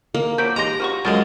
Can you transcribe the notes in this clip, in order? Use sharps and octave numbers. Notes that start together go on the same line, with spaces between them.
A#3
F3 F#3 B5 G6 D7
G#3 D#4 G4 A#5 C6 A#6
F3 F#4 C#6
F#2 F3 G#3 A#3 A6